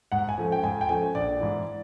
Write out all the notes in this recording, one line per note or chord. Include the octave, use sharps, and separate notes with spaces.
G#2 F#5
G#5
F3 A3 C#4
G5
G#2 G#5
G5
F3 A3 C#4 G#5
A#1 D5
G#2 E3